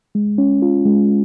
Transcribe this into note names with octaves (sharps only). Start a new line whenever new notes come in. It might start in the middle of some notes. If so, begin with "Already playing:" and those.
G#3
C#4
F4
G#3